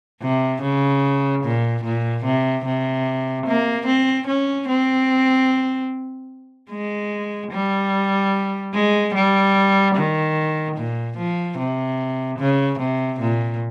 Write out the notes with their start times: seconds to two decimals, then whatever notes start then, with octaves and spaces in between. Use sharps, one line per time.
0.22 C3
0.62 C#3
1.44 A#2
1.84 A#2
2.25 C3
2.65 C3
3.47 A#3
3.87 C4
4.27 C#4
4.68 C4
6.71 G#3
7.52 G3
8.74 G#3
9.15 G3
9.96 D#3
10.77 A#2
11.18 F3
11.58 C3
12.39 C#3
12.80 C3
13.21 A#2